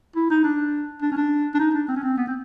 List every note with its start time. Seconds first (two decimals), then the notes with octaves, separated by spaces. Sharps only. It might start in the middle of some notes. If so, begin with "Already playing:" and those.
0.16 E4
0.30 D#4
0.44 D4
1.02 D4
1.12 C#4
1.17 D4
1.54 D4
1.60 D#4
1.75 D4
1.88 C4
1.96 C#4
2.03 C4
2.17 B3
2.27 C4